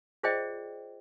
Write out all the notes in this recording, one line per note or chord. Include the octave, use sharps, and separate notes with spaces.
F4 G#4 C5 D5 D#5 G5